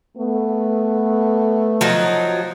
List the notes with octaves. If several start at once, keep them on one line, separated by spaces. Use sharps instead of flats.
A3 B3
F3 F#3 D#4